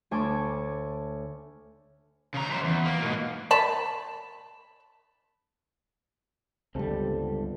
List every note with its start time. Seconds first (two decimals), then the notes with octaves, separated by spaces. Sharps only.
0.11 D2 C#5 G#5 A5 C6 D6
2.34 C#3 A#5
2.49 F#2 C5
2.64 E2
2.85 A#3
3.02 G#2 B2
3.51 A5 B5
6.75 G1 C#2 G3 C4 A4